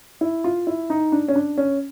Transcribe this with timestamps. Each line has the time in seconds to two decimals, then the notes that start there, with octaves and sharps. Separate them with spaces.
0.21 E4
0.44 F4
0.67 E4
0.90 D#4
1.12 D4
1.28 C#4
1.35 D4
1.58 C#4